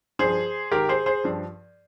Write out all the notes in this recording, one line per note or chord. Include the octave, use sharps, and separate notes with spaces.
G2 F3 G#4 C5
G#2 D#3 G4 A#4
G#4 C5
G#4 C5
G2 F3